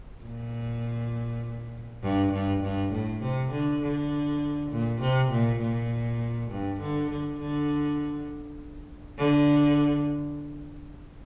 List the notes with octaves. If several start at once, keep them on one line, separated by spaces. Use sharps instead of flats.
A#2
G2
G2
G2
A2
C3
D3
D3
A#2
C3
A#2
A#2
G2
D3
D3
D3
D3